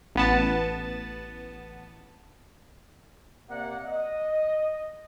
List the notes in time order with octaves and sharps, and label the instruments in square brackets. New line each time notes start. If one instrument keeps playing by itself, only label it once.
[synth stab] A1 B3 A5
[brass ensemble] C3 A#3 D5 F#5
D#5